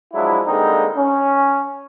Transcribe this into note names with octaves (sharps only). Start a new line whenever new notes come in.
F3 F#3 G#3 D4 E4
D3 G3 G#3 A#3 C4 D#4
C#4